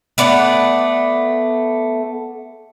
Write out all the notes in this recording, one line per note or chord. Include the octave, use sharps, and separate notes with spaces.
A3 B3 D5 F#5